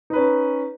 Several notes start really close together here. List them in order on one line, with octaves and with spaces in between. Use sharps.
D#4 B4 C#4